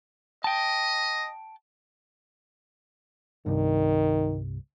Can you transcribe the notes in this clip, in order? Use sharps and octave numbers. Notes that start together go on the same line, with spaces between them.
D#5 G5 A5
C2 G2 D#3